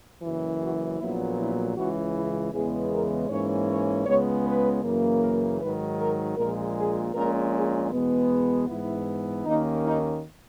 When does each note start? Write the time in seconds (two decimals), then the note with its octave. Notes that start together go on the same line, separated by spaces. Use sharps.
0.22 F#1 F#2 E3
0.60 F#4
0.98 A#1 A#2 F#3 B3 E4
1.38 E4
1.75 C#2 C#3 E3 F#4
2.15 E4
2.52 E2 C#3 E3 G#3 B3 G#4
2.92 A#4
3.30 G#2 E3 A#3 C#4 C#5
3.68 C#5
4.06 C#2 C#3 G#3 B3 C#5
4.45 B4
4.83 F#2 C#3 E3 A#3
5.22 A#4
5.60 G#2 D#3 F#3 B4
5.99 A#4
6.37 A#1 A#2 G#3 A#4
6.76 G#4
7.14 A#1 A#2 G#3 C#4 A#4
7.54 G#4
7.92 E2 B2 G#3 B3
8.68 G#2 E3 B3 E4
9.45 D#2 D#3 A#3 C#4 D#4
9.85 D#4